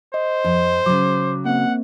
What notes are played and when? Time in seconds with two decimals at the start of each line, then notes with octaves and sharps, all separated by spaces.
0.14 C5 D#5
0.44 F2
0.86 C#3 F#3 D6
1.45 A#3 C4 F#5